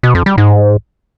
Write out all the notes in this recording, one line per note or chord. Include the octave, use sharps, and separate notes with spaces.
B2
F2
G3
G#2